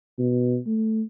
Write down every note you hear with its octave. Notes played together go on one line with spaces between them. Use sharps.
B2
A3